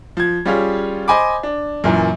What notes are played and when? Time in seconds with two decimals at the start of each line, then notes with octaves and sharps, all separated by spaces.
0.17 F3 G#6
0.46 G3 C#4 F4 G#4 C#5
1.08 C5 D#5 G#5 B5 D6
1.43 D4
1.84 F#2 A#2 E3